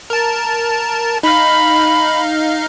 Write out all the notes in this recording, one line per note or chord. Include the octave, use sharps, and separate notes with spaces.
A#4 A5
D#4 F5 B5